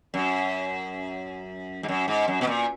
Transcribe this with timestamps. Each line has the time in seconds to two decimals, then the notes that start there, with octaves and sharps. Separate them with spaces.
0.14 F#2
1.83 G#2
1.88 F#2
2.08 G#2
2.28 F#2
2.41 B2
2.47 A#2